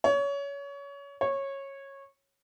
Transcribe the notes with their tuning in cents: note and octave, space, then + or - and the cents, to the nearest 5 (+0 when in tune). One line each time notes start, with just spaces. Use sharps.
C#5 +25
C#5 -15